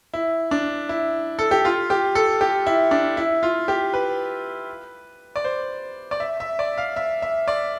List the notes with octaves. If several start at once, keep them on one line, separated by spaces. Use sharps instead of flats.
E4
D4
E4
A4
G4
F4
G4
A4
G4
E4
D4
E4
F4
G4
B4
D5
C5
D5
E5
E5
D5
F5
E5
E5
D5